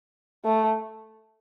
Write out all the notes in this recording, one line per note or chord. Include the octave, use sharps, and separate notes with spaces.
A3